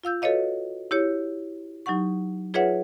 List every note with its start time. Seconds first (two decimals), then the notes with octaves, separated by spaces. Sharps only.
0.04 F4 F5 E6 G6
0.22 F#4 A4 B4 C#5 D#5 F5
0.91 E4 G4 C#5
1.86 F#3 D#4 G4 F#5 C#6
2.54 F4 G#4 B4 C#5 E5 F#5